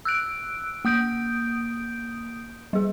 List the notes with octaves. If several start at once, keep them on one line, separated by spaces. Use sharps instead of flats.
E6 F#6 D7
A#3 D#6 G6 D7
G3 G#4